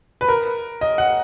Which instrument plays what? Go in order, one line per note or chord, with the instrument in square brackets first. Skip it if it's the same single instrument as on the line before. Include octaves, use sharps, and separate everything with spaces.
[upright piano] B4
A#4
D#5
F#5